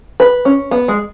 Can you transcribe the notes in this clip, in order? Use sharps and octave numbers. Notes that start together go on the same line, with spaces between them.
B4
C#4
B3
G#3